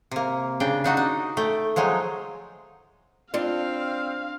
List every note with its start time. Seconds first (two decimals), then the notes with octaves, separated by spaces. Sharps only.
0.11 C3 A#3
0.60 C#3 D4 G5
0.84 D4 D#4 F#4
0.97 D#4
1.37 A3 G5
1.76 F3 F#3 G#3 D#4
3.34 C4 D4 F4 F5